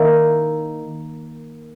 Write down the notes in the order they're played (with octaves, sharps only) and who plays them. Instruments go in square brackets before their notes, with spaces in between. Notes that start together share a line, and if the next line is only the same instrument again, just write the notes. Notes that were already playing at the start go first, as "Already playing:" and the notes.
Already playing: [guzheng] D#3 A#3 E4